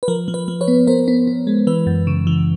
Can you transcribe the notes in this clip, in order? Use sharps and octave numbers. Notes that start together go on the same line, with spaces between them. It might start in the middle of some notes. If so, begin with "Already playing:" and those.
B4
F3 A#4
F3
B4
F3
B4 C#5
B3
B3 A#4 C5
B3
B3
G#3
E3 B4
F#2
C#3
E3